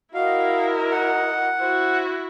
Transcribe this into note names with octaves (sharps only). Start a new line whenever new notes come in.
E4 F#4 A#4 D#5 F5
F#5
E4 F#4 C5